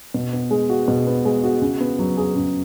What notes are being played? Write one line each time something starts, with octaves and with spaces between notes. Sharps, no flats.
B2
B3
G#3
F#4
B2
B3
G#3
F#4
C#3
B3
F#3
G#4
C#3